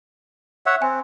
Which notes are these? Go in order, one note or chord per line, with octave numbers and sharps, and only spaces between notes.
C#5 E5 F#5
C4 G#5